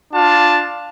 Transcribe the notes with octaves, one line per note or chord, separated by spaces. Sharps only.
D4 F4 A5